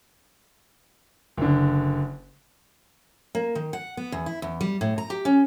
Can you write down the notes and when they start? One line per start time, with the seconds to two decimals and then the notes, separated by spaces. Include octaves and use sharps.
1.38 F#1 D3
3.35 A#3
3.55 D#3
3.73 F#5
3.97 B3
4.12 E2
4.26 E4
4.42 E2
4.61 G3
4.81 A2
4.98 A#5
5.10 G4
5.25 C#4